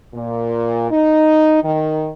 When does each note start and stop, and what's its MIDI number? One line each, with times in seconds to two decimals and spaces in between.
0.15 0.90 46
0.92 1.63 63
1.63 2.12 51